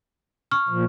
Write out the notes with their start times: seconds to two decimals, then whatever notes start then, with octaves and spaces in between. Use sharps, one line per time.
0.51 C#6 F6
0.69 A#2 F3